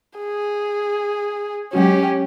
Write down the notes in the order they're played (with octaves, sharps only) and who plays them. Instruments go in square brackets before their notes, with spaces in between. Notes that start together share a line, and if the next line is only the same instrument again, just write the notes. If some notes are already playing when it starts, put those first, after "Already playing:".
[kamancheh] G#4
[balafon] F#3 G#3 F#4 [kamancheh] C#4 G4